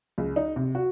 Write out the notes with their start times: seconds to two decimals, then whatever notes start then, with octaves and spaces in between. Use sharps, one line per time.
0.18 C#2
0.36 D#4
0.56 C3
0.75 F#4